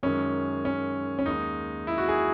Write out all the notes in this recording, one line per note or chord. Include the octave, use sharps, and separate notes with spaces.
F#2 D#3 G#3 C#4
C#4
C#4
D#2 D#3 G#3 D#4
E4
F#4
G#4